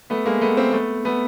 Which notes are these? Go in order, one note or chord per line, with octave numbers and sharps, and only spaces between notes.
A3 B3
G#3 A#3
A3 B3
A#3 C4
A3 B3
A3 B3